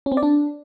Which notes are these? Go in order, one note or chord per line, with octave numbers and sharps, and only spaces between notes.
C#4
C4
D5
D4